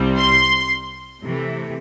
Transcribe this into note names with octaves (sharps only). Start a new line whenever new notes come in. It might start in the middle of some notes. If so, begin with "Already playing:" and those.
Already playing: C2 C3 G3 C4
C6
C3 E3 A3